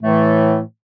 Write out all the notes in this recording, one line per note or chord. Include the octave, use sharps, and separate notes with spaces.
A2 E3 A3